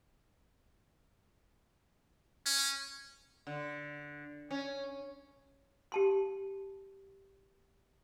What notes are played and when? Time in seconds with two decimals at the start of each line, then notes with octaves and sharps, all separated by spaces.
2.46 C#4
3.47 D3
4.51 C#4
5.92 G4 A5 C6